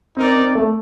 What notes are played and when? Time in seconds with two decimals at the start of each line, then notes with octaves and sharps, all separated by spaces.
0.16 C4 D#4 A#4 D5
0.36 C4
0.55 A3